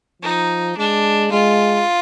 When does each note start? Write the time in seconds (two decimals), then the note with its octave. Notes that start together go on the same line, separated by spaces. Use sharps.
0.22 F3 D#4
0.77 G#3 D4
1.32 G#3 F4